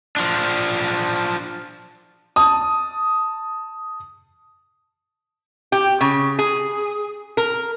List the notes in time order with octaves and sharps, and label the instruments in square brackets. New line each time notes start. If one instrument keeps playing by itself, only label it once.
[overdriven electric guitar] F3 D4
[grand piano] A5 D#6
[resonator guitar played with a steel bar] G4
C#3
G#4
A#4